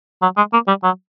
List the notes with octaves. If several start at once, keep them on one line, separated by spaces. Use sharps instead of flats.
F#3
G#3
A#3
G3
F#3